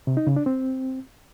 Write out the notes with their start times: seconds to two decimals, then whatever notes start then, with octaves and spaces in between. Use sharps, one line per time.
0.07 C3
0.17 D#4
0.27 C#3
0.36 D4
0.46 C4